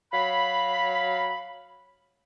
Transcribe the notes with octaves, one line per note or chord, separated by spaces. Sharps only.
F#3 F5 B5